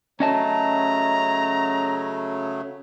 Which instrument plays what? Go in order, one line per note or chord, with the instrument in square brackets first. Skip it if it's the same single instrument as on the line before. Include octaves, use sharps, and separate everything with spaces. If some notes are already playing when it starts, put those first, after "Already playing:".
[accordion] C#3 F#3 A3 [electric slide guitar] C#4 D#5 A5 [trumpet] A#5